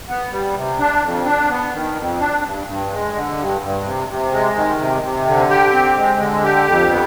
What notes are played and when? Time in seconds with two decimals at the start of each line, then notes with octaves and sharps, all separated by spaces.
0.08 B3
0.32 G3
0.56 C3
0.79 D4
1.03 F2
1.26 D4
1.50 B3
1.74 D#3
1.97 F2
2.20 D4
2.44 G2
2.67 G2
2.91 G#3
3.15 D3
3.37 G2
3.62 G2
3.84 C3
4.08 C3
4.31 G#3
4.56 D#3
4.80 C3
5.03 C3
5.26 D3
5.50 G4
5.73 C4
5.97 G#3
6.20 D3
6.44 G4
6.67 F2
6.90 B3